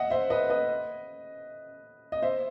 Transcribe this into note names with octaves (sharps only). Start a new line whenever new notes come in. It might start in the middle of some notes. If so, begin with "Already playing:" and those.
Already playing: D#5 E5 F#5
C5 E5
B4 D#5
B4 D#5
D#5
C5 E5